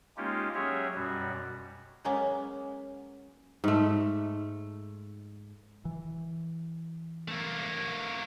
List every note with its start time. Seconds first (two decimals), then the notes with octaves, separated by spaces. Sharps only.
0.17 G#3 A#3 C#4 D#4 F4 G4
0.55 F#3 C#4 G4 G#4 C#5 E5
0.94 F#2 B2 G3 F#4
2.04 F#3 G#3 A#3 B3 C#4
3.64 G#2 A3
5.85 E3
7.28 A3 A#3